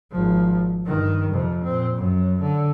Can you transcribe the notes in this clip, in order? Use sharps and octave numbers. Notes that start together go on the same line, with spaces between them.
G#1 F3
G2 D#3
F2 C3
A#2 C4
F#2
D3